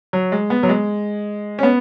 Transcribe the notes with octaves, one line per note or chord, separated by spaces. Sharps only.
F#3
G#3
B3
F#3
G#3
C#4
B3